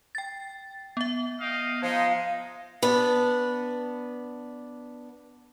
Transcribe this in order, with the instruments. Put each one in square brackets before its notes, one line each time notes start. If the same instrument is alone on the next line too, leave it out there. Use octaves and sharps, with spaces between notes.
[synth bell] G5 A6
B3 E5
[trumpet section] D#5 F5 G5
[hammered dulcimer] F3 [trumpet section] G#3 D#4
[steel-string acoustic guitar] B3 D4